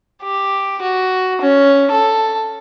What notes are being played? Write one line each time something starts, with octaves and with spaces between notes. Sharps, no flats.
G4
F#4
C#4
A4